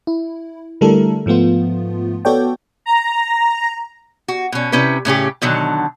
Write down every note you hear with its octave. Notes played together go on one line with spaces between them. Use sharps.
E4
D3 G3 A3 E4 A4 A#4
G#2 F3 A3 B3 F4
B3 F#4 A4 C#5 D5 G5
A#5
F#4
B2 C#4
C3 C#4 E4 B4
A2 C#3 C#4 G4
B2 D3 D#3 F#3